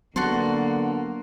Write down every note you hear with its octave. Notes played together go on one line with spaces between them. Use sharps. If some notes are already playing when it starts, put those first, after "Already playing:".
D3 F#3 A#3 B3 F#4 A4 C6